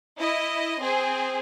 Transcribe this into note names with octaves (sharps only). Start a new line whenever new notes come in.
E4 D#5
C4 G#4